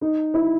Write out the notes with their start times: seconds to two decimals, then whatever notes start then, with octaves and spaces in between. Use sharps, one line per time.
0.01 D#4
0.34 E4